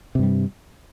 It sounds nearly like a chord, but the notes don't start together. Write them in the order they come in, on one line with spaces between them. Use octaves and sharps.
C3 G2 G3